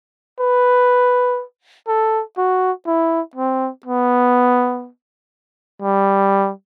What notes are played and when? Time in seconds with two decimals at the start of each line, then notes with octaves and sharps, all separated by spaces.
0.40 B4
1.88 A4
2.37 F#4
2.86 E4
3.36 C4
3.86 B3
5.82 G3